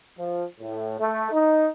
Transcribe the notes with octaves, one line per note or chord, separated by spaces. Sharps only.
F3
A2
A3
D#4